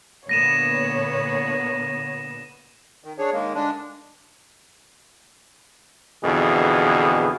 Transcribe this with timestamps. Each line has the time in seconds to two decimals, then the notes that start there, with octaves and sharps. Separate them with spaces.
0.29 A#2 D3 B3 C#5 A#6 D#7 E7
3.04 D#3
3.18 D4 G#4 C#5
3.33 D#3 G#3 A#3
3.55 D3 G#3 D4
6.24 F2 B2 D3 E3 G#4